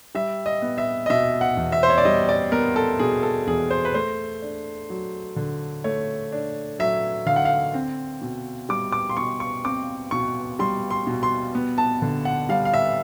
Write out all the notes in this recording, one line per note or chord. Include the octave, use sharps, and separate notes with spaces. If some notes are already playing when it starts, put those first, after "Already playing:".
G3 E5
D#5
B3
E5
D#5
B2 E5
F#5
E2
E5
C5
C#5
D5
G3 D#5
D5
B3 A#4
A4
B2 G#4
A4
E2 G#4
C5
B4
A3 C5
D4
F#3
D3
A3 C#5
D4
F#3 E5
D3 F5
F#5
F5
C4
B2
G3 D6
D6
C6
B2 C#6
C#6
C4 D6
B2 C#6
G3 C6
C6
B2
C6
B3
A5
D3
F#5
G3 F5
F5
E5